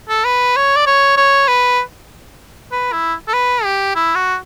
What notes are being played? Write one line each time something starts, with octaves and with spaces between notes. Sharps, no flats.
A4
B4
C#5
D5
C#5
C#5
B4
B4
E4
A4
B4
G4
E4
F#4